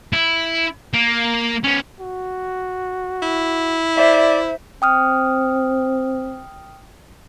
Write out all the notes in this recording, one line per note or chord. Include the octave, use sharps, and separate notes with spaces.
E4
A#3
B3 C#4
F#4
E4
C5 D5 E5
C4 G5 D#6 F6